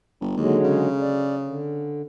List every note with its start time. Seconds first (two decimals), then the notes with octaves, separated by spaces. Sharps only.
0.21 G1
0.37 D#2 D3 F#3 G#3
0.64 C#3
1.01 D5
1.45 D3